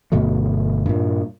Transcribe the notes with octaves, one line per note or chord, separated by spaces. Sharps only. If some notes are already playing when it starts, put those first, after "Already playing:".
G1 B2 F#3 A3
G2 A#2